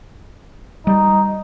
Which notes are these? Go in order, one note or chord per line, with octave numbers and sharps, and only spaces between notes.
G3 D#4